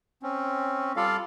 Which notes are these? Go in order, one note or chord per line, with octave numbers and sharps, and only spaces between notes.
C4 C#4
G3 F4 A4 D5 F5